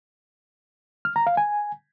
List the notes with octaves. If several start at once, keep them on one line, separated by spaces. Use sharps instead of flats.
F6
A#5
F5
G#5